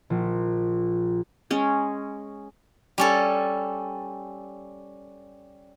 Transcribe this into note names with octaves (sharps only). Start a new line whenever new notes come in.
A#1
G#3 C#4
G3 C#4 A4